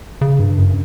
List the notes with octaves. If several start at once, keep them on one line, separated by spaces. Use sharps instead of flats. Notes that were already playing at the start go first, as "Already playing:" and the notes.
C#3
G2
F#2